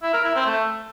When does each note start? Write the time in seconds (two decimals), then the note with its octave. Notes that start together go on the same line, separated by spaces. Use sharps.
0.03 E4
0.14 A#4
0.24 E4
0.35 C4
0.46 A3